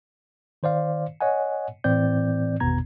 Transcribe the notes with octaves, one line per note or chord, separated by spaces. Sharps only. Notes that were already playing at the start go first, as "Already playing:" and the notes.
D#3 C5 D5 F5
C#5 D#5 F#5 G#5
A2 E3 C4 D5 G6
G#1 E2 B2 B3 A#5 G#6